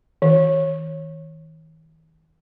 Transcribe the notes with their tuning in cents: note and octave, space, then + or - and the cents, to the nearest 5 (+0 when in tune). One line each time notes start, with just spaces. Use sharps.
D#3 +45